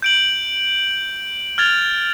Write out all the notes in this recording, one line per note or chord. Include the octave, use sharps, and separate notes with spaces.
G6 D7 F#7
F6 G#6 A6 F7